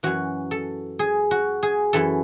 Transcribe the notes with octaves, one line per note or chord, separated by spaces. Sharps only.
F#2 E3 F#4
A4
G#4
F#4
G#4
F#2 E3 A4